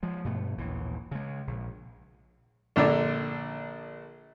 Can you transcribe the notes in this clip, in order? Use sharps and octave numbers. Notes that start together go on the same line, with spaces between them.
F3 G#3
G2 B2 A3
A#1 D#2 E3
C#3 G#3
A#1
A#1 D3 D4